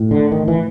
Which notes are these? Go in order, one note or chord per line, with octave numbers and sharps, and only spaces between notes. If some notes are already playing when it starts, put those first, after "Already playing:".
Already playing: A2
D3
D#3
E3